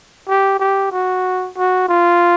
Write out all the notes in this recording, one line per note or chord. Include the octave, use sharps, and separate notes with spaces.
G4
G4
F#4
F#4
F4